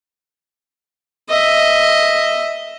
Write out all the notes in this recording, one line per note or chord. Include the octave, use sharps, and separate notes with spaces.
D#5 E5